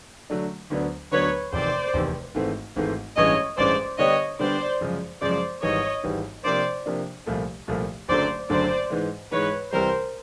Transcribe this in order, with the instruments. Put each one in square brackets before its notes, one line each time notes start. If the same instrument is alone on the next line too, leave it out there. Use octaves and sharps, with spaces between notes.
[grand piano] D3 F#3 A3 D4
D2 D3 F#3 B3 D4
[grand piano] D2 D3 F#3 B3 D4 [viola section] B4 C#5
[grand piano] F1 E2 C3 D#3 [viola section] C5 D5
[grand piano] F1 E2 C3 D#3
G#1 G#2 E3 A3 C4
G#1 G#2 E3 A3 C4
[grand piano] A1 G2 E3 G#3 C#4 [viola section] C#5 D#5
[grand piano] A1 G2 E3 G#3 C#4 [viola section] C5 D5
[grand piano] D3 G3 B3 D4 G4 [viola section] C#5 D#5
[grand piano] D3 G3 B3 D4 G4 [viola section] C5 D5
[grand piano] F#2 C#3 F3 G#3
[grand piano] F#2 C#3 F3 G#3 [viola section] C5 D5
[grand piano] G#1 G#2 E3 G3 [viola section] C#5 D#5
[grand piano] G#1 G#2 E3 G3
[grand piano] C3 F3 A#3 D4 [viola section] C5 D5
[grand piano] C3 F3 A#3 D4
C2 A#2 F3 A3
C2 A#2 F3 A3
[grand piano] F#1 F#2 D3 F#3 A3 [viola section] C5 D5
[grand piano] F#1 F#2 D3 F#3 A3 [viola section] C5 D5
[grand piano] G#2 E3 G#3
[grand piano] G#2 E3 G#3 [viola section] B4 C#5
[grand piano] C2 C3 E3 G3 [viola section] A#4 C5